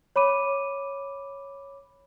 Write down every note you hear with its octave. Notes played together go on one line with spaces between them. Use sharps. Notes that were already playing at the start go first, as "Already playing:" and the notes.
C#5 B5 D6 D#7